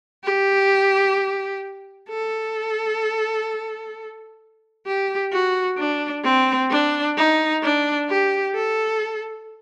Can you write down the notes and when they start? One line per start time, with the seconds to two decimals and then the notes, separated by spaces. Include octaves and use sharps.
0.24 G4
2.09 A4
4.86 G4
5.32 F#4
5.78 D4
6.24 C4
6.71 D4
7.17 D#4
7.63 D4
8.10 G4
8.55 A4